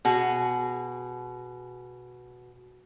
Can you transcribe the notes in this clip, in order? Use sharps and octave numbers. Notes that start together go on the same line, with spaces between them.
B2 F#4 G#4